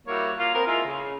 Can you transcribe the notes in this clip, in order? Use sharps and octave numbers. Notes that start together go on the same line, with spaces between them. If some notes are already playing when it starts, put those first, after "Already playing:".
G3 A#3 E4 F#4 C#5
A#3 F4
B3 C4 A#4
G#3 A#3 E4 F4
C#3